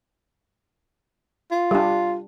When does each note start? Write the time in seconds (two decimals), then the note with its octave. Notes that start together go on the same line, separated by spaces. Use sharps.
1.51 F4
1.71 G3 D4